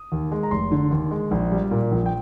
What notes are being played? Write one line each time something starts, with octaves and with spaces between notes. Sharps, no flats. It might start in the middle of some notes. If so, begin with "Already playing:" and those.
Already playing: D#6
D#2
G#3
A#5
F1 C6
D3
D#2
G#3
A#1
G3
A#2
A#1
G5